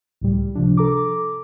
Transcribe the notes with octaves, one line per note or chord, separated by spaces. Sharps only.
C#2 A2 G3
C3 F3 D4
A4 A#5 D6